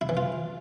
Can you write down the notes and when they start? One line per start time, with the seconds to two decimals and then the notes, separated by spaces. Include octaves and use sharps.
0.01 E4
0.09 E3
0.17 F4